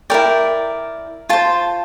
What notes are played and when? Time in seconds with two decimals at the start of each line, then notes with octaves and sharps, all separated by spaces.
0.10 E4 A#4 D5 G5
1.29 F4 C5 A5